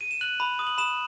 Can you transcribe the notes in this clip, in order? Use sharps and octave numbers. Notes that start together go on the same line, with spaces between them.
D#7
E7
F#6 F#7
B5
D#6
F#7
B5 E7